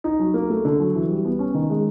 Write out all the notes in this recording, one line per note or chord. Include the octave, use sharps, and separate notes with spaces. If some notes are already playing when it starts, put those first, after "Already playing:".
D#4
F#3
A#3
A3
D3
F#3
E3
G3
B3
C#4
D#3
G#3